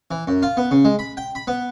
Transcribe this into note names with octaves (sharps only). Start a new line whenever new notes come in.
E3
F#2
F4
B3
C#3
G#3
B5
G5
B5
B3